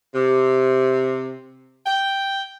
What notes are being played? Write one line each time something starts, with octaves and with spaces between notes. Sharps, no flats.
C3
G5